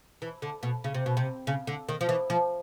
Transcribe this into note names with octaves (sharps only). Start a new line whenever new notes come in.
E3
D3
B2
C#3
C3
B2
C3
C#3
D3
D#3
F3
E3
F3